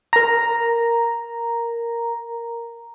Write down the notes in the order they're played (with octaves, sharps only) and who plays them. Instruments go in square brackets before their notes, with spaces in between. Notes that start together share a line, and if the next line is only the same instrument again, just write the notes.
[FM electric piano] A#4 A#5